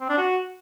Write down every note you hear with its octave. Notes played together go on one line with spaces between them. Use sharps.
C4
D4
F#4